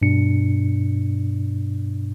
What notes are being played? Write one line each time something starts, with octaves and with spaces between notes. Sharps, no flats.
G2 B2 D4 C#7